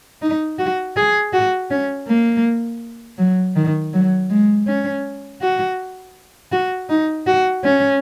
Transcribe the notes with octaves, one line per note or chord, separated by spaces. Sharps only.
D#4
F#4
G#4
F#4
C#4
A#3
F#3
D#3
F#3
G#3
C#4
F#4
F#4
D#4
F#4
C#4